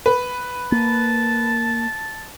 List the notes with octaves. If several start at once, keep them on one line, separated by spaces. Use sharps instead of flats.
B4
A#3 A5